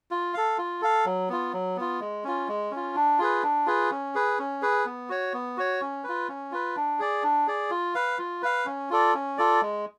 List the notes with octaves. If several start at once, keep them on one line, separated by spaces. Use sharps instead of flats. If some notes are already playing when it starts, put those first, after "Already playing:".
F4
A4 F5
F4
A4 F5
F#3
B3 F4
F#3
B3 F4
G#3
C#4 F4
G#3
C#4 F4
D4
F4 G#4 B4
D4
F4 G#4 B4
C#4
G#4 B4
C#4
G#4 B4
B3
F#4 C#5
B3
F#4 C#5
C#4
F4 B4
C#4
F4 B4
D4
G#4 D5
D4
G#4 D5
F4
B4 F5
F4
B4 F5
C#4
F4 A4 D5
C#4
F4 A4 D5
G#3